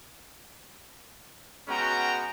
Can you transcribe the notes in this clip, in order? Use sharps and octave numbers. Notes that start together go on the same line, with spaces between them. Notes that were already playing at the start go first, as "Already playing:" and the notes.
G#3 B3 C#4 F#4 G5 A#5